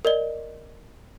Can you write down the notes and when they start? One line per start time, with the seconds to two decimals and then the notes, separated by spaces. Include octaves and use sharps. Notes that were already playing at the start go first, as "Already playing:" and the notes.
0.05 A#4 D5 D#5 G7